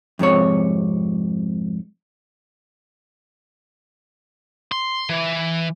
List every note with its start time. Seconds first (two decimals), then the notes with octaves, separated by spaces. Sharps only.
0.19 F2 G#2 C3 C#5
4.72 C6
5.10 E3